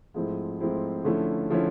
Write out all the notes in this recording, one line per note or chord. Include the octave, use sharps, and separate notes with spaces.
G#2 F3 A3 C4 E4
G#2 F3 A3 C4 E4
D3 F3 A3 C#4 E4
D3 F3 A3 C#4 E4